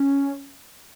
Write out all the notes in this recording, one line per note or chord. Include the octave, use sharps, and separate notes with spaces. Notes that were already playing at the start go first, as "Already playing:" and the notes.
Already playing: C#4